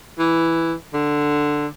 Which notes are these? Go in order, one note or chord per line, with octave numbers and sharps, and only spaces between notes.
E3
D3